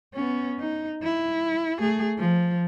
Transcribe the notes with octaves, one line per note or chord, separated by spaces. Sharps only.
B3 C#4
D#4
E4
A3 G#4
F3